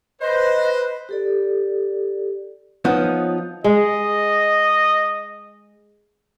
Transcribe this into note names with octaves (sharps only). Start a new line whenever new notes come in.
B4 C5 D#5
G4 A4 D5
F3 B3 D#4 C#5 D#6
G#3 D#5